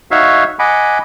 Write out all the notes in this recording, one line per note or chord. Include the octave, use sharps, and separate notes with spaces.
D#4 F#4 C#5 E5 F5
D#5 F#5 G#5 B5 D6